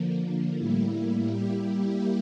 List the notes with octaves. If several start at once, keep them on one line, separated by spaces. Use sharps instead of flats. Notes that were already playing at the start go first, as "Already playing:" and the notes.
Already playing: D3 F3 A#3
A2 G3 A#3 E4
G3 A#3 E4 G4